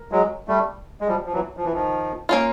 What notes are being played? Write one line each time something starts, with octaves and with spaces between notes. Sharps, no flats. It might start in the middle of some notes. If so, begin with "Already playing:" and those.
Already playing: A#4
F#3 G#3
G3 A3
G#3
F3 G3
F3
E3 F#3
F3
E3
D#3 F3
A#3 C#4 F4